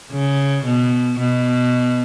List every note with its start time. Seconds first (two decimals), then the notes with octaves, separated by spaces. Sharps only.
0.12 C#3
0.65 B2
1.19 B2